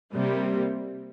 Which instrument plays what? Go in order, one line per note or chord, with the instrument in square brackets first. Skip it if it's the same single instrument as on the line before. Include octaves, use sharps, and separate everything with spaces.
[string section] C3 G3 A#3